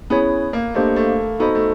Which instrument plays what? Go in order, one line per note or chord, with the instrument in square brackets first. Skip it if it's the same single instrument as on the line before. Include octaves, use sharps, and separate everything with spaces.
[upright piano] B3 [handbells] C#4 E4 G#4 C#5
[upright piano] A#3
[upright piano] A3 [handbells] A#3 D4 G4 C5 D#5
[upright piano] A3
[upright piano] B3 [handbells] D#4 F#4 A4 C5 D#5
[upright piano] A3